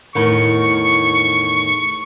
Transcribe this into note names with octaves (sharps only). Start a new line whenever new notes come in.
E2 A2 D#3 C#6